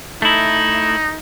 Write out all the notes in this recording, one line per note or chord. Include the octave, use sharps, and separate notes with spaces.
A3 D#4 E4